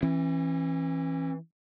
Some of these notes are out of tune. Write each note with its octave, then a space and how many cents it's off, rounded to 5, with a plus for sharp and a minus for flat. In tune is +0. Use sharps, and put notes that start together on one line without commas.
E3 +0 C#4 -45